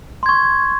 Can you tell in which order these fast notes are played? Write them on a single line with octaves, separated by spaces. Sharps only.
C6 G#6 C#6